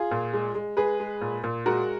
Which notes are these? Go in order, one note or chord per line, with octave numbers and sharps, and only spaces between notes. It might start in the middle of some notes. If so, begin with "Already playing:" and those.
Already playing: F4 G#4
A#2
G#3
G#3
G#3 G#4 B4
G#3
A#2
A#2
G#3 F#4 A#4